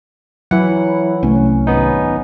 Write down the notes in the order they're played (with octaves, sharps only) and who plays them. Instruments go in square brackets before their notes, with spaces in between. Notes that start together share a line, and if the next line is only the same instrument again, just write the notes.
[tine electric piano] E3 F#5 [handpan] F#3 [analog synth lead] E4
[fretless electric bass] C2 A3 [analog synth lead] C#4
[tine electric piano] G#1 B3 D#4